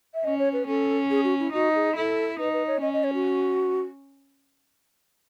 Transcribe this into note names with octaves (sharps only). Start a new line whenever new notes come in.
E5
C#4 D#5
C#5
B4
C#4 A4
G#4
F#4
E4
D#4 F#4
G#4
E4 A4
D#4 B4
B4
C#5
C#4 D#5
D#5
C#5
F#4